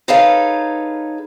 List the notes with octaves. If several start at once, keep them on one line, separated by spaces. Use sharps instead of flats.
D#4 G#4 A4 B4 C#5 F5